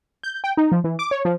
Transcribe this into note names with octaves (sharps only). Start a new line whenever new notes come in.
G6
G5
D#4
F3
E3
D6
C#5
F3